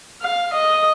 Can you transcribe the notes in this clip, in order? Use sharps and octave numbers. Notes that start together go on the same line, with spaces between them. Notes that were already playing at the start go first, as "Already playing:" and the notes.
F5
D#5